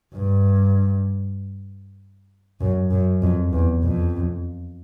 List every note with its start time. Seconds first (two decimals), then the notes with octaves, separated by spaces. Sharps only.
0.14 G2
2.61 F#2
2.91 F#2
3.22 F2
3.53 E2
3.83 F2